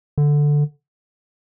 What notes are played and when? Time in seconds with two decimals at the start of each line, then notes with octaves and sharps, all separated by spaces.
0.18 D3